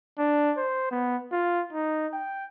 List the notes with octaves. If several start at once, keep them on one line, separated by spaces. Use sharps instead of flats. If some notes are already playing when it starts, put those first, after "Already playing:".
D4
C5
B3
F4
D#4
G5